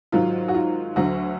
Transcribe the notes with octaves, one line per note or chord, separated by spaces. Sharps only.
G#2 D#3 F#3 F4
F#4
F4
D2 D3 F#3 F#4